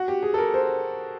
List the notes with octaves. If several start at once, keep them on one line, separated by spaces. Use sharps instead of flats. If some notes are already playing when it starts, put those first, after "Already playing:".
Already playing: F#4
G4
G#4
A4
A#4
C5